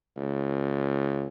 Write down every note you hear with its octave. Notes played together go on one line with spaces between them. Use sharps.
C#2